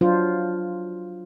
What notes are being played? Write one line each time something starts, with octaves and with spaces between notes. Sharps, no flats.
F#3 D4 F4 C5